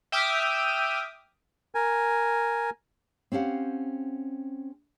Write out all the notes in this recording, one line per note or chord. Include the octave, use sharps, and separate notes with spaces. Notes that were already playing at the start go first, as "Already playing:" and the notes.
E5 G5 D6 D#6 F6
A#4 G#5
C4 C#4 G4 F5 F#5